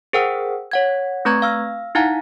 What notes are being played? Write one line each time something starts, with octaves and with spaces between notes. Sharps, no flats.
G#4 A#4 C5 F#5 G5 E6
C#5 F#5 G#6
A3 C4 B4 A#5 C#6 G#6
F5 E6 F6
D#4 E4 F5 F#5 G#5 A#5